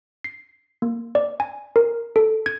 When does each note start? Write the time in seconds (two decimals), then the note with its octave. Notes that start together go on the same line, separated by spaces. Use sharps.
0.24 C7
0.82 A#3
1.15 D5
1.40 G#5
1.76 A#4
2.16 A4
2.46 G#6